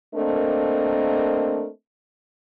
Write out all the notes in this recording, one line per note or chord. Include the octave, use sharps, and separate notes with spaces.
A3 A#3 C4 D4 A#4 D#5